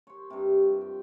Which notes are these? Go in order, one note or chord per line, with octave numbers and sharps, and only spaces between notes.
C5 C#5
G2 C3
F3
G5